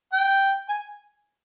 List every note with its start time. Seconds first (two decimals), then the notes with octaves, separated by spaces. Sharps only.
0.13 G5
0.69 G#5